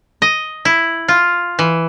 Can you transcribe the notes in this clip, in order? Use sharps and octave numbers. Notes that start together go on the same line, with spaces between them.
D#5
E4
F4
E3